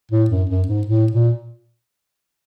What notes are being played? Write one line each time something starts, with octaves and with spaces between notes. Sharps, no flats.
A2
F#2
F#2
G#2
A2
A#2